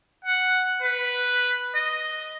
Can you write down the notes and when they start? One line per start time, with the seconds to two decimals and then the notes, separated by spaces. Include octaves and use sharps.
0.25 F#5
0.82 B4
1.75 D#5